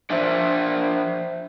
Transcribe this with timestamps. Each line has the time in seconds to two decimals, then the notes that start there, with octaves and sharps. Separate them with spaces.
0.10 F3 D4 C5 D5 E5 G#5